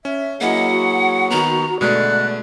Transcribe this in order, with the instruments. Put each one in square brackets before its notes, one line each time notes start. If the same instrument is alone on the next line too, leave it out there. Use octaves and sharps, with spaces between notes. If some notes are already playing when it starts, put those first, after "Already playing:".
[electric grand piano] C#4 [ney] E5
[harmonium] F#3 G#4 [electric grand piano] A#3 E4 [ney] D#5 [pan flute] F#5
[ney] F#4
[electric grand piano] D#3 B3 [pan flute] A#5
[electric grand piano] B2 G#3 A3 [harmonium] D3 [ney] D5 [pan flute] F#6